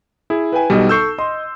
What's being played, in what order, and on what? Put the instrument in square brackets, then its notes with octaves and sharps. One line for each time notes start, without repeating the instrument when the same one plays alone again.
[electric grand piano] E4 [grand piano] G#4
[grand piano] B4 G5 G#5
[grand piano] B1 D#5 [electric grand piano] B2 G3
[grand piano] A4 C#6 [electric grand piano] E6 G6 C7
[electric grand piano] D#5 [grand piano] C6